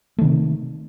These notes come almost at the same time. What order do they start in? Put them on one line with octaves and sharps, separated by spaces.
A3 D#3 C3